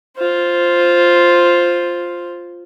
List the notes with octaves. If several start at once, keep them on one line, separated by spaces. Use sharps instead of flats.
F4 C5